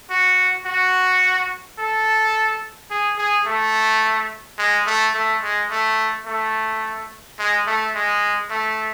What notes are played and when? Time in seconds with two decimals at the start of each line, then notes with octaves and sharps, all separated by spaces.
0.10 F#4
0.66 F#4
1.79 A4
2.91 G#4
3.18 G#4
3.46 A3
4.59 G#3
4.86 A3
5.14 A3
5.43 G#3
5.70 A3
6.26 A3
7.39 G#3
7.67 A3
7.95 G#3
8.51 A3